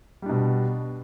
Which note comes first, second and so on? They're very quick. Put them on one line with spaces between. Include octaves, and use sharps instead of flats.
G3 D4 B2